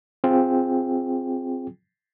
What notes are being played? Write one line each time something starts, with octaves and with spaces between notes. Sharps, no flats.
C4 F4 G#4 G5